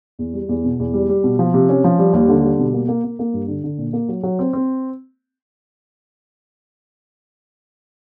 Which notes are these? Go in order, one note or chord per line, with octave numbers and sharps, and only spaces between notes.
E2
G3
E2
B2
E2
G3
G3
B2
F3
C3
C#4
F3
G3
D#2
D3
G3
B2
A#3
A#3
A#3
A#3
G2
D3
D3
A#2
A#3
F#3
F#3
C4
C4